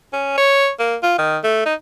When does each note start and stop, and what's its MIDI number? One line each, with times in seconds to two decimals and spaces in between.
0.13 0.33 61
0.37 0.70 73
0.79 0.96 58
1.03 1.16 65
1.19 1.38 51
1.44 1.63 57
1.65 1.74 63